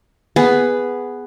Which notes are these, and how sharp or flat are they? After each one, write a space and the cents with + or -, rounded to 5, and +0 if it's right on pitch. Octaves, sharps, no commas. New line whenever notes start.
B3 +5 G#4 +0